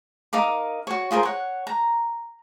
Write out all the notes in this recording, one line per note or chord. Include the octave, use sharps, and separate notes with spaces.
D#4 A#4 F5 D6
F#4 C#5
F4 G#4 A#4 C5
C#5 F#5
A#5